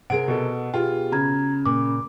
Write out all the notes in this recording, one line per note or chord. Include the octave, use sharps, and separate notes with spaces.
C3 G#4 A#4 F#5 D7
B2 A4
B2 F4 G4 G#4 G5
C#3 F#4 A#5 G#6
A#2 D6